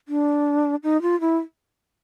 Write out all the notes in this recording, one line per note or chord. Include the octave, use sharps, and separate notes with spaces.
D4
D#4
F4
E4